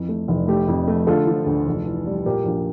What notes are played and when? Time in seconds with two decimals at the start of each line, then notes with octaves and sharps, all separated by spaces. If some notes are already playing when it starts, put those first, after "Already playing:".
Already playing: F2 E3
0.09 A3
0.28 F1
0.48 A3 G4
0.68 F2
0.88 A3
1.07 D3 F4 A4
1.27 F3
1.46 D2
1.67 F1
1.86 E3
2.06 G3
2.26 A#2 G4 A#4
2.46 A#1